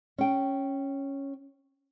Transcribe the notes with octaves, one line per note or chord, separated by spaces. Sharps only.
C#4 G5